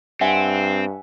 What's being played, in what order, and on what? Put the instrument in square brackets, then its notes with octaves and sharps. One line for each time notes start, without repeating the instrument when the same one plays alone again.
[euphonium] G2 [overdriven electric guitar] C4 [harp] E5 F#5 G#5